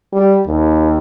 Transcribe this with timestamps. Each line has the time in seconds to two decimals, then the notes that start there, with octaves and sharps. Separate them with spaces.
0.12 G3
0.47 D#2